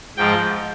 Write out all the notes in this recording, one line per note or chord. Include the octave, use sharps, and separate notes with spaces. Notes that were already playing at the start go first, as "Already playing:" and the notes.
G#2 F3 G#3 G5